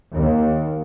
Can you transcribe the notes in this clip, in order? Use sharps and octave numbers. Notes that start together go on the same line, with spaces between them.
D#2